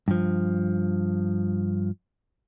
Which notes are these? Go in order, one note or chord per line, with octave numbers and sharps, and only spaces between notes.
G2 F3